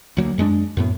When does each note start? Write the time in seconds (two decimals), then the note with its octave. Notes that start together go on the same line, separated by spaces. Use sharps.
0.17 D2 F#3 A#3
0.38 F#2 G#3 A#3 D4
0.77 F#2 A2 B3